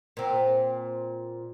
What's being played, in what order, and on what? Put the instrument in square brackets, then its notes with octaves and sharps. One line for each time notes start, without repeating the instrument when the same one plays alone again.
[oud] A#2 C4